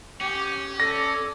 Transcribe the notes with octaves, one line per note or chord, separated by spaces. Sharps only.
C#4 G4
A4 D5 A#6